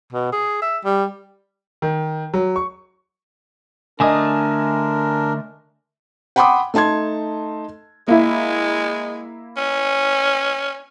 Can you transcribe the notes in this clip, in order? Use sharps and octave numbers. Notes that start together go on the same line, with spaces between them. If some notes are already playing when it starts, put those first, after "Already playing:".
B2
G#4
E5
G3
D#3
F#3
C#6
D3 A3 D4 A#4 D#5 G#5 D#6
F#5 G5 B5 C6 D6 D#6
A3 D#4 A5 C6 G#6
G#3 A#3 E4
C#4